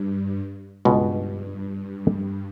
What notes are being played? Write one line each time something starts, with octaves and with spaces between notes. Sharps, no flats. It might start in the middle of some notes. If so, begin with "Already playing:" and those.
Already playing: G2
C#2 G2 B2 G#3 B3